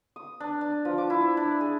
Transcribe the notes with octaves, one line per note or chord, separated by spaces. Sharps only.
D#6
D4
D4
F3
D6
E4
D4
G#4